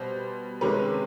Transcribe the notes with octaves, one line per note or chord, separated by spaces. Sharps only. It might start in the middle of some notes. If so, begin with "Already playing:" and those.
Already playing: B2 G3 C5
C3 D#3 G#3 C#4 B4